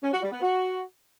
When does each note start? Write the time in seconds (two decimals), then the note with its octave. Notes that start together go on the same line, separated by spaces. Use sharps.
0.03 C#4
0.13 F#4
0.22 G3
0.32 B3
0.41 F#4